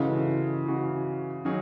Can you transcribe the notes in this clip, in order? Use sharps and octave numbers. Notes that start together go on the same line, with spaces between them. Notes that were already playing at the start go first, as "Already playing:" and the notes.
Already playing: C#3 E3 G#3 D#4 F#4 A4
C#3 E3 G#3 C#4 F#4
D#3 F#3 C#4 G#4